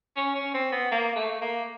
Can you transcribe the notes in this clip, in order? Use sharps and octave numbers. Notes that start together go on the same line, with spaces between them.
C#4
C#4
C4
B3
A#3
A3
A#3